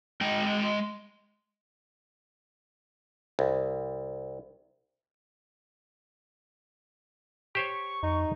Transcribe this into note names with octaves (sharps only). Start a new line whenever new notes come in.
G#3 D#5 G5
C2
G4 C5 C#5 C#6
F2 D#4